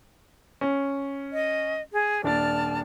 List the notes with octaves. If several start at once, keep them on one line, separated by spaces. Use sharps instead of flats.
C#4
D#5
G#4
D#1 D4 D5 A5 F6 A6